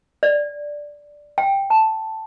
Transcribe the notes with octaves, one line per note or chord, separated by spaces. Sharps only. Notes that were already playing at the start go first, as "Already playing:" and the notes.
D5
G5
A5